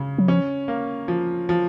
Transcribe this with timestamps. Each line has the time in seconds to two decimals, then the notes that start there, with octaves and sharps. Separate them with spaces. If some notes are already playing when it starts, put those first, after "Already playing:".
Already playing: C#3
0.18 F#3
0.28 F3 C#4
0.68 A#3
1.08 F3
1.49 F3